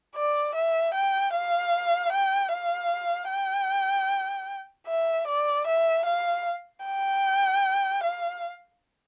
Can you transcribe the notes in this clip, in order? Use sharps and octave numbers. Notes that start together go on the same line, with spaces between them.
D5
E5
G5
F5
G5
F5
G5
E5
D5
E5
F5
G5
F5